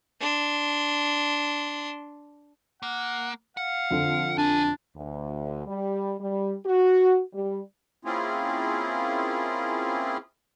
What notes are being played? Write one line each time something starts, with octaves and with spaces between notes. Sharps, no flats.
D4 C6
A#3 F#5
F5 F#5
F2 D3
D4 G4 G#5
D2
G3
G3
F#4
G3
A#3 C4 C#4 E4 F4 G#4